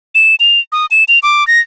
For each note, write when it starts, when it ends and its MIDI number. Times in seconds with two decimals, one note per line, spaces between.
0.15 0.35 100
0.40 0.60 101
0.72 0.86 87
0.91 1.04 100
1.08 1.19 101
1.23 1.46 86
1.47 1.60 94